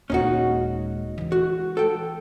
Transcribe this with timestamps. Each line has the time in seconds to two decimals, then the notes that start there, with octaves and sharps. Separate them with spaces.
0.10 D#1 G#3 C#4 D#4 F#4
1.18 E3 G#3
1.32 F#4
1.77 A4 G5